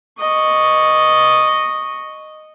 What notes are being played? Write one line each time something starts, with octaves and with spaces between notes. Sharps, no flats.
D#5 C#6